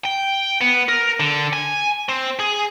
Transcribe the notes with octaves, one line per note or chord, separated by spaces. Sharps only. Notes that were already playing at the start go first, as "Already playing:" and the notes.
G5
B3
A#4
D3
G#5
C4
G#4